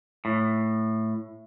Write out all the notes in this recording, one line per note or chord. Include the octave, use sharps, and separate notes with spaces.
A2